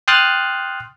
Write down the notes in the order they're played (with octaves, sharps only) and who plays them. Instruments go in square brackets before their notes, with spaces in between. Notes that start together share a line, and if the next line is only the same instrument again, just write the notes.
[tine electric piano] G5 C6 D#6 F6 F#6 A6